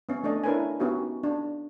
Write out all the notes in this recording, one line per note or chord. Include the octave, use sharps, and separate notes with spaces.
B3 C#4
A3 D4 D5 D#5
D4 E4 A#4 B4 C#5 G#5
B3 C#4 D#4 F#4 G4
D4